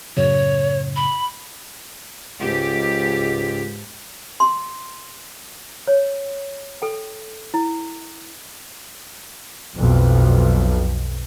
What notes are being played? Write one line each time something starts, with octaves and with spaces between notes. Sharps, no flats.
F#2 A2 C#3 C#5
B5
C#2 G#2 G4
C6
C#5
A4 G5
E4
B1 F2